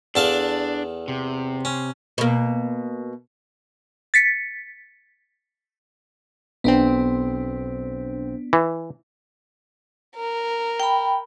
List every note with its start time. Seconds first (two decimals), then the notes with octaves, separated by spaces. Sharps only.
0.15 E2 D4 A4 F5
1.08 C3
1.65 C#4
2.18 B2 A#3
4.14 A6 B6 C#7
6.64 B1 B3 C4 D4
8.53 E3
10.16 A#4
10.80 G5 B5